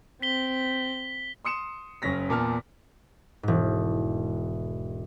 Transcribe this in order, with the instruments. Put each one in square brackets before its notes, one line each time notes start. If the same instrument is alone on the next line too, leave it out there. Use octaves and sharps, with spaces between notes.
[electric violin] C4 [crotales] B6 G7
[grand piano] C6 D#6 C#7 E7
F#1 C#3 C#4 A#6 B6
E2 A#2 A5 F6
[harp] E1 G#2